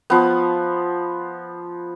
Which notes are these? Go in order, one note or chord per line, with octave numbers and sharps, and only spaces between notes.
F3 B3